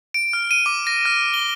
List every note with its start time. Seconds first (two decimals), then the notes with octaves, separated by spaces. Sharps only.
0.14 D7
0.33 F6
0.51 D#7
0.66 D6
0.87 A#6
1.05 F6
1.34 G7